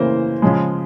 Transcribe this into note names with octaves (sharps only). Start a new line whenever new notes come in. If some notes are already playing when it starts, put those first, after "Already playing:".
Already playing: C#3 E3 A#3 C5
C#3 F3 G#3